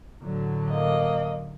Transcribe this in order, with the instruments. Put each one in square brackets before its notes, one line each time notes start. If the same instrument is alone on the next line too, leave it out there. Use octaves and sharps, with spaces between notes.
[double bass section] A2 D3 F#3
[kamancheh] A#3 D#5